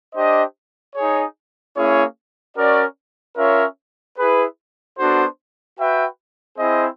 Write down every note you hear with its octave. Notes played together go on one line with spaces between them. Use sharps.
D4 G4 C5 D#5
D#4 G#4 C#5
A#3 C#4 E4 G#4 C#5
C#4 F#4 A#4 D5
C#4 F4 A#4 C#5 E5
E4 G#4 B4
B3 D4 F#4 A4 C5
F#4 B4 E5 G5
C4 E4 G#4 C5 D#5